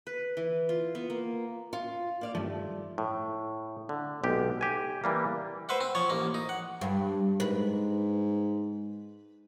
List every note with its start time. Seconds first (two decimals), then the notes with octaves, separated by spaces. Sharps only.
0.07 B4
0.37 E3
0.69 F4
0.95 B3
1.10 A#3
1.73 F4
2.21 A#3 D5 F5
2.35 G2 D#3 F3 A3
2.98 A2
3.89 D3
4.24 B1 G#3 G4
4.61 G4 G#5
5.04 E3 G3 A#3
5.69 B4 C5 E5 F#5
5.81 C4
5.95 F3 C#5
6.10 A1 A#3
6.34 D#4
6.49 F#5
6.81 G2
7.40 G#2 B4